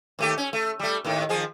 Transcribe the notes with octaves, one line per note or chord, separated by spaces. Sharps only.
D#2 A3 G4
C#4
A3
G3 A3
D#2 A2 D#3
D#3 F3 G#4